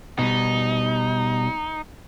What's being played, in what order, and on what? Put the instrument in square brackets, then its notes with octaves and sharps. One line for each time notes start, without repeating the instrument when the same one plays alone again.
[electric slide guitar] B2 G3 [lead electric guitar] D#4